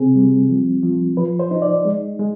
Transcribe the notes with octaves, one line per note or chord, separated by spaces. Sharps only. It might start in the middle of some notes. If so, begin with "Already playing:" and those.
Already playing: C3 C4 G#4
G3
F3
F3
F3 B4
C5
D#4
D5
G#3
G#3